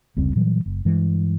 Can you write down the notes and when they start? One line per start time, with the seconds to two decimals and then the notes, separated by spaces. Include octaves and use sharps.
0.17 F1 C#2 G3 C4
0.36 A#2 E3 F#3 G3
0.66 F#1
0.85 G2 E3 G#3